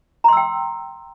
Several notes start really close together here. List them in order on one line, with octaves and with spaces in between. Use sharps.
A#5 C6 E6 G5